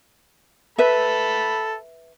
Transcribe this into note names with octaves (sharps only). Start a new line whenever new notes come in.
A4 B4 E5 B5